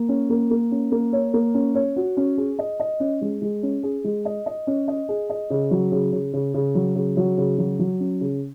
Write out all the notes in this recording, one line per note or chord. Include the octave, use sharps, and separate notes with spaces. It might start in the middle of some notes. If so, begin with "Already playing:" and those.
Already playing: A#3
C#4
A#3
A#3
C#4
A#3
C#5
A#3
C#4
C#5
F#4
C#4
G#4
D#5
D#5
C#4
G#3
G#3
C#4
G#4
G#3
D#5
D#5
C#4
D#5
G#4
D#5
C#3
F#3
C#3
C#3
C#3
C#3
F#3
C#3
F#3
C#3
F#3
F#3
C#4
C#3